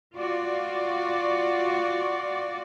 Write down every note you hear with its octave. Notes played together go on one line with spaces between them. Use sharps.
F4 F#4 D5